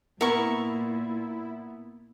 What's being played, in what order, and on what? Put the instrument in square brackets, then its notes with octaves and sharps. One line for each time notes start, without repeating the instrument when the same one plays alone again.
[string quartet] A#2 [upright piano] B3 [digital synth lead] E4 [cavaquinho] A#4 C#6